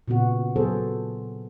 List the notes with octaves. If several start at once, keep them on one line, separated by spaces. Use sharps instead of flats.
A#2 C#3 B3 F#4
F#3 B3 G#4 A4 C5